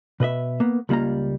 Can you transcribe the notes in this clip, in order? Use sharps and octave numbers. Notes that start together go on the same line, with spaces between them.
B2 B4 D#5 E5
A#3 B3
C#2 G3 A#3 F4 A#5